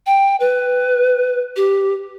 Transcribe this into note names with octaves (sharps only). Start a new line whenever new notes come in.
G5
B4
G4